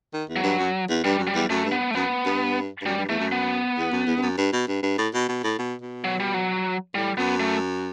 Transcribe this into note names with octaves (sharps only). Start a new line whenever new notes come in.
D#3
E2
F#3
G2
F#2
E2
G2 G3
F#2
G3
E2
F#2 A3
G2
B3
A3
F#2 B3
G2
G2
F#2 G3
G2
E2 A3
F#2
B3
E2
F#2
E2
G2
F#2
G2
B2
G2
G2
A2
B2
B2
A2
B2
B2
F#3
G3
F#3
A2 G3
F#2 B3
A3